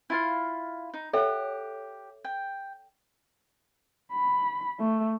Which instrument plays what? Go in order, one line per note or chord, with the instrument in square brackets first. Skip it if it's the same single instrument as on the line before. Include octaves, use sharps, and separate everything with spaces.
[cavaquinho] E4 F4 F5
D#4
[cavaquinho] G4 F#5 [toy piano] A4 C#5 E5
[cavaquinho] G5
[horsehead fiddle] B5
A3